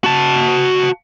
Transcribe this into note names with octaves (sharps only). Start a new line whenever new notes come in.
F#4 A5